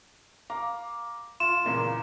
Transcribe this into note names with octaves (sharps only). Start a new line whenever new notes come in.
F5 A#5 D6
F4 C6 E7
E2 A#2 C#3 A#4